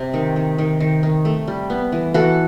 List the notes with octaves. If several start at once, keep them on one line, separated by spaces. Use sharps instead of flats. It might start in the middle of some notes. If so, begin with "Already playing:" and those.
Already playing: C3
D#3
D#3
D#3
D#3
D#3
A3
G3
B3
E3
E3 F#4 A4